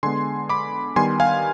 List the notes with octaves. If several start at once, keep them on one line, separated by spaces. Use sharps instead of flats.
D3 G#3 B3 G#5 C6
B5 D6
D#3 G3 B3 G#5 C6
F5 G#5